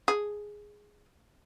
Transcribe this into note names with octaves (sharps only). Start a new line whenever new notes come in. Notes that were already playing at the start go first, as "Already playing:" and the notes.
G#4